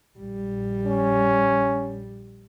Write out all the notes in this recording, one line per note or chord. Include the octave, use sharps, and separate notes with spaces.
A#1 G3
C#4